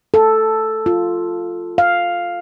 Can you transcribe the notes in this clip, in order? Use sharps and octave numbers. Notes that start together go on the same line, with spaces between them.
A4
F4
F5